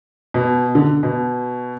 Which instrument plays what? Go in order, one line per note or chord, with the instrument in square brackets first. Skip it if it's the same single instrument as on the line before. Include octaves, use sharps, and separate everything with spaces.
[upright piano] B2
D3
B2